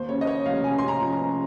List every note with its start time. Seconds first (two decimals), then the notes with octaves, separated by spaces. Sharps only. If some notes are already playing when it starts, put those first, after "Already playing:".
Already playing: D#2 C5
0.09 C#3 C#5
0.21 D#5
0.27 C#3 C#5
0.46 F1 F5
0.64 C#3 G#5
0.78 C#3 C6
0.88 A#5
1.00 F3
1.13 A#5
1.19 C#3